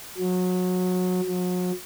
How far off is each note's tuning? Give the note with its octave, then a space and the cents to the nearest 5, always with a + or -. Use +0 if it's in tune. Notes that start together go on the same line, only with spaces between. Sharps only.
F#3 -25
F#3 -40